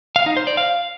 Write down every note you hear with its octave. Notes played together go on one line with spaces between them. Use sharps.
F5
D#4
C5
D5
F5